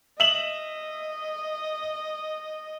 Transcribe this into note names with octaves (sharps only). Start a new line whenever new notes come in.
D#5 E5 E7 F#7